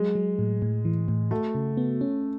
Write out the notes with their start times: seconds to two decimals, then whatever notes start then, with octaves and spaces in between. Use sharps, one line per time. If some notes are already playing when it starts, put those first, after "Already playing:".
Already playing: F#3 G#3
0.15 F#3
0.39 A2
0.62 A2
0.85 E3
1.08 A2
1.31 A3 F#4
1.55 C#3
1.77 B3
2.01 C#4